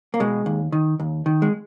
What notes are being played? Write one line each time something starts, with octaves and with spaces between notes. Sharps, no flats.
A#3
B2 G#3
D#2
D#3
D#2
D#3
G#3